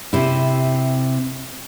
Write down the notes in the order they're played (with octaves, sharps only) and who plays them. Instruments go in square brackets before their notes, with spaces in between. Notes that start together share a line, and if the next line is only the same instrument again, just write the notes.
[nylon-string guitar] C3 E4